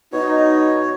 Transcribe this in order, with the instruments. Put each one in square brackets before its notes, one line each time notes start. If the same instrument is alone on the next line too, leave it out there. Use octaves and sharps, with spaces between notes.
[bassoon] B2 [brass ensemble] D#4 [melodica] C#5 [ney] D#5